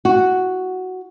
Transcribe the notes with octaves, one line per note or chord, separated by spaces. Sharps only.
F#4